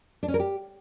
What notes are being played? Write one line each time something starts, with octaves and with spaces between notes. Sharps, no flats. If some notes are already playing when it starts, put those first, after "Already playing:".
D4
C#4
A#4
G4